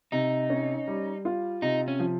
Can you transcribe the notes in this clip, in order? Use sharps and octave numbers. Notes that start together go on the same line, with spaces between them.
C3 D#4
C#4
G3
F4
C3 D#4
C#4
F3